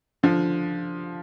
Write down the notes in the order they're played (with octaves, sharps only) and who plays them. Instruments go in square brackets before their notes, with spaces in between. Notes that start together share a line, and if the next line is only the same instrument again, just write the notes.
[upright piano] D3 F3